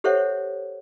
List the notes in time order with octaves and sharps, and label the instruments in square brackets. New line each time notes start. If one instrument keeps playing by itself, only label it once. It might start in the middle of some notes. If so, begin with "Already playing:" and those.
[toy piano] G4 A4 C5 C#5 E5 F#5